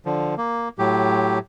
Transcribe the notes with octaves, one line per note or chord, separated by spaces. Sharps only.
D3 F3
A#3
A2 F#3 G4